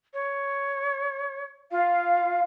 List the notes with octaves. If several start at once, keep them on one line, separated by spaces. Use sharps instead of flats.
C#5
F4 F5